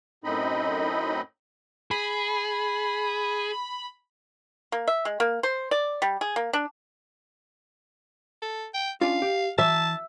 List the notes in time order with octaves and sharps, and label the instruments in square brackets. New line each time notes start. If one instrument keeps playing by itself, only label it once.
[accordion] F#2 A2 C4 D#4 D#5 B5
[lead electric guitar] G#4 [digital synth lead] B5
[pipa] A#3
E5
G#3
A#3
C5
D5
G3
G#4
A#3
D4
[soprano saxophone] A4
G5
[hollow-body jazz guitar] C#4 D4 F4 [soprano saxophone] F5
[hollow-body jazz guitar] G4
[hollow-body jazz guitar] E3 [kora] E5 [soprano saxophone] A5